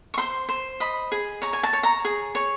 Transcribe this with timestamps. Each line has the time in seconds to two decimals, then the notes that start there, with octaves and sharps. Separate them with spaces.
0.14 C#6
0.18 C5 C6
0.49 C5
0.80 D#5 B5
1.12 G#4
1.42 C#5 A#5
1.53 G#5
1.63 A5
1.73 C#5
1.83 A#5
2.05 G#4
2.35 C#5